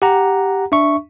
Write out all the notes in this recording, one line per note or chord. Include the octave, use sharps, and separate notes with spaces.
G4 F#5 A#5
D4 E5 C#6